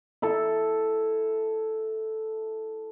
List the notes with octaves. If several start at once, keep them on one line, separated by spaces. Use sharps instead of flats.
E4 A4